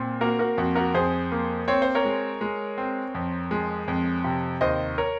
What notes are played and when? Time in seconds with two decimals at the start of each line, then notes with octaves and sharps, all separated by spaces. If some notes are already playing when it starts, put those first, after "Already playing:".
Already playing: A#2 C4
0.21 A#3 F#4 A#4
0.39 F#4 A#4
0.58 F2 F#4
0.75 F#4 A#4
0.94 F2 G#4 C5
1.31 A#3
1.68 C4 C#5
1.82 C5
1.95 A#4 C#5
2.05 G#3
2.41 G#3
2.78 C4
3.15 F2
3.51 G#3
3.88 F2
4.24 C3
4.61 D#2 C5 D#5
4.98 A#4 C#5